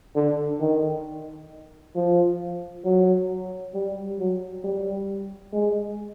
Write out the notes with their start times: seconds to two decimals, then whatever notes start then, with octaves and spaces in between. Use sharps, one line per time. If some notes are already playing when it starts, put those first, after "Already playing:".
0.16 D3
0.60 D#3
1.96 F3
2.85 F#3
3.74 G3
4.19 F#3
4.64 G3
5.53 G#3